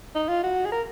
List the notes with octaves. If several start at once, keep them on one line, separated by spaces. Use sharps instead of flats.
D#4
F4
F#4
G#4
A#4